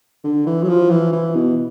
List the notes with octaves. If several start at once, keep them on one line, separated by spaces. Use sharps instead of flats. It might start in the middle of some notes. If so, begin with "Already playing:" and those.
D3
E3
F#3
F3
E3
E3
B2